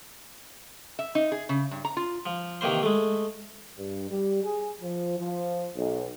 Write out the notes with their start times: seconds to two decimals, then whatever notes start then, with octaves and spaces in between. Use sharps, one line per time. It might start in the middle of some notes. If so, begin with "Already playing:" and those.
0.99 E5
1.15 D#4
1.32 G#4
1.49 C#3
1.71 G2
1.85 A#5
1.97 F4
2.26 F3
2.61 C3 D#3 E3 A#3 C5 C6
2.83 G#3 A3
3.78 G2
4.10 G3
4.44 G#4
4.81 F3
5.18 F3
5.75 B1